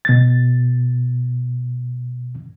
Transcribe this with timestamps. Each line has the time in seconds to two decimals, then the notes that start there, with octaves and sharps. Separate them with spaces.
0.05 B2 A6